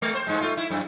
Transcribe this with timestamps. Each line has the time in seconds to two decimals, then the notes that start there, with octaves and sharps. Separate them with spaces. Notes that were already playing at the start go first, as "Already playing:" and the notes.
0.02 G#3
0.15 C5
0.27 G2 G#3
0.41 A3 F4
0.57 E4
0.71 F#2